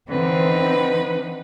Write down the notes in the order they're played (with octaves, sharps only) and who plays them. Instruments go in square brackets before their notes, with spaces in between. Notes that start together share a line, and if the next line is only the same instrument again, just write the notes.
[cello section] D3 E3 D#4 [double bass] C4 [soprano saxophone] B4